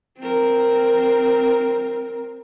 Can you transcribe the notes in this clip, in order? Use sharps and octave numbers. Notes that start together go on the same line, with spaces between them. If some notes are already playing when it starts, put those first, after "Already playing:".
C4 A#4